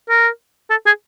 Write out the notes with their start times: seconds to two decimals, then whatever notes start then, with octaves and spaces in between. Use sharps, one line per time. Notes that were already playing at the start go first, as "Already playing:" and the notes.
0.09 A#4
0.70 A4
0.86 G#4